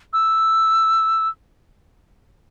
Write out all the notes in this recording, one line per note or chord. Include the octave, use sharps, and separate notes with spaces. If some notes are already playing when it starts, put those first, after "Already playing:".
E6